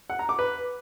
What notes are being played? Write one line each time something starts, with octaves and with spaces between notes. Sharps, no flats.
F#5
A#5
D6
B4